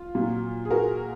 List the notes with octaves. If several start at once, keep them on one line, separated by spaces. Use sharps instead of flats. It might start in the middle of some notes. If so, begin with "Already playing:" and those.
Already playing: F4
A#2 F#3
G#4
F#4 A#4